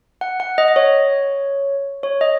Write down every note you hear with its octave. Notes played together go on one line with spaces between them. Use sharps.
F#5
F#5
D#5
D#5
C#5
C#5
D#5